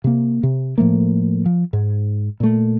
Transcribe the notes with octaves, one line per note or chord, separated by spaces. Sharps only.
C3 A#3
C3
A2 F3 A3 A#3
F3
G#2
A#2 A3